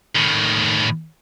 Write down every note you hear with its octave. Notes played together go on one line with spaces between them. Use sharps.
A2 D#3